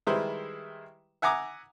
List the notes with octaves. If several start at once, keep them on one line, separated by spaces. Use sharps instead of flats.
D#3 G3 G#3 E4 B4 C5
E5 F#5 G#5 A#5 D6 D#6